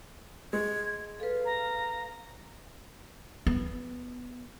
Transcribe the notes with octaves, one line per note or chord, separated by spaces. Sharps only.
G#3 G#6
A4 B4 F5
A#5
B3